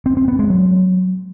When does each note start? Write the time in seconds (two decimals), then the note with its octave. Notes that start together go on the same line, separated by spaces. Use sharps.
0.06 C4
0.17 C4
0.28 B3
0.39 G#3
0.50 F#3